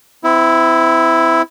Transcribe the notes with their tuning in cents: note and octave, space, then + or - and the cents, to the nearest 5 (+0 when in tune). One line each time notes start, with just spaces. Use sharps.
C4 -40 E4 +0